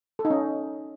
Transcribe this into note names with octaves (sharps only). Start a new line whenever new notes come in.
A4
D#4
C#4